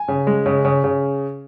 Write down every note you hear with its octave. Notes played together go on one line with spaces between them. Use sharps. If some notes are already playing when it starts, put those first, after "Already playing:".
Already playing: G#5
C#3
G#3
C#3
C#3
C#3